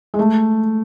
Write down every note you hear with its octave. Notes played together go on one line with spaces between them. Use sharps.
G#3
A3